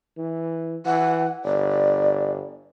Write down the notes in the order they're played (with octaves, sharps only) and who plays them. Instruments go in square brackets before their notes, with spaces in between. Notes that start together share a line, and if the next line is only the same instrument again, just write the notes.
[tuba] E3
[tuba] E3 [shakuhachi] F#5
[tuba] G1 [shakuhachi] D5